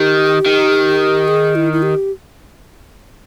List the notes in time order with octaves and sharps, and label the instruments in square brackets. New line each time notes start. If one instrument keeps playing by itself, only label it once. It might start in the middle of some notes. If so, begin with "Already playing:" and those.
Already playing: [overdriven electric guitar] D#3 [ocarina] G4
[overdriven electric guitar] D#3
[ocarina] G#4
E4
E4
G4